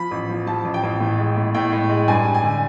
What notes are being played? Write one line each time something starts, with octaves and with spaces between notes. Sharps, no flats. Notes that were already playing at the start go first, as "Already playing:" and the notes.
Already playing: F3 B5
A1
F3
F3 A5
A1
G5
A1
A2
G#3
A2
A2 G5
A2
G#3
G2 G#5
G2
G#5
D3